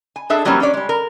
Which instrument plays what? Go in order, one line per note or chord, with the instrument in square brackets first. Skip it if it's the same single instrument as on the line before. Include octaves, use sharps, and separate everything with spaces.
[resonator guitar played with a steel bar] G#5
D4 G#4 A4 E5
E3 F#3 G3 A#3 C4 C#4
C#4 D4 C#5 D5
G3 G#3
A#4